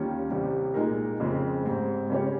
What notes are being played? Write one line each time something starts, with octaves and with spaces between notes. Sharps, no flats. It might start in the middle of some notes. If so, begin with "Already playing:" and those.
Already playing: D#2 D#3 G3 C#4 F4
C2 C3 G3
A#2 G#3 D#4 A#4
F2 C#3 G#3 C4
G#2 G3 C4
C#3 G3 C#4 G4 C#5